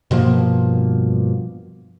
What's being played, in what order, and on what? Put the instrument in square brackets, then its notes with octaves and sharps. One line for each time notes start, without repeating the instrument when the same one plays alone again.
[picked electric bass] G2 B2 F3 A#3